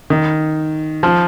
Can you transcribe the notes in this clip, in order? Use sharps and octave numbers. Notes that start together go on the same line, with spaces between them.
D#3
F3